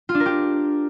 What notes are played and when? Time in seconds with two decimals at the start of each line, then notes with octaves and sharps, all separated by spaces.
0.09 F4
0.14 D4
0.20 A#4
0.26 G4